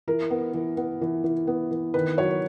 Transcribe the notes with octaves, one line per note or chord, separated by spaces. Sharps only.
E3 A#4
B3
E3
B3
E3
E3
B3
E3
D#3 B4
F#3 C#5